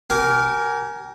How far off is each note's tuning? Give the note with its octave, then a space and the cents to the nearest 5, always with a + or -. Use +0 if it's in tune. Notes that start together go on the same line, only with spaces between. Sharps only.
G4 -35 A#4 +0 G#5 +10